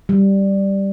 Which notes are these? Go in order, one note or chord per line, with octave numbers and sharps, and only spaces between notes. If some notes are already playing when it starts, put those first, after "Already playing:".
G3